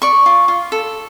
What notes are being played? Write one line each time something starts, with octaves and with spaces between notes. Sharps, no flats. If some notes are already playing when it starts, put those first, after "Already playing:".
D5 C#6
F4
F4
A4